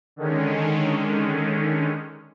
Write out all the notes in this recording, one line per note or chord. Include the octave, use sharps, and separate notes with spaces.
D3 D#3 G#3 C#4